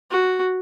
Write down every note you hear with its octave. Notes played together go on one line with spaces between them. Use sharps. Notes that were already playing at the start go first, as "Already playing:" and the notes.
F#4